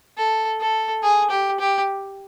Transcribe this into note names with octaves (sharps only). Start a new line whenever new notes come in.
A4
A4
G#4
G4
G4